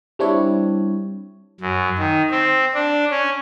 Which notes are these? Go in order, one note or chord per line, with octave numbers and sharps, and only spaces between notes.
G3 C4 D4 E4 C#5
F#2
D#3
C4
D4
C#4